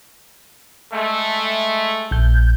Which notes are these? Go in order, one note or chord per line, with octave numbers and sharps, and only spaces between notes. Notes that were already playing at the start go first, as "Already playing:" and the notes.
G#3 A3
A#1 G6